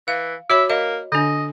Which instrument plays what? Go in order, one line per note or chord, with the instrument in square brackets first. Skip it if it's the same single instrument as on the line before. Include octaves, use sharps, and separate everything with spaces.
[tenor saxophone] E3 [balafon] F5
[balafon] F#4 C#5 B5 [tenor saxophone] E5
[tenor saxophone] A#3 [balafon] D#5
[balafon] D3 D4 [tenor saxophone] D#5